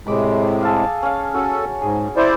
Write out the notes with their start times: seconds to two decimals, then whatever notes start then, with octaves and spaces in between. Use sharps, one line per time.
0.07 A2 C3 G#3 B5 D6
0.63 G#4 A4 F5
1.03 C#4 F5
1.34 C#4 F#4 A4
1.82 G#2 G#4
2.16 E4 C5 D5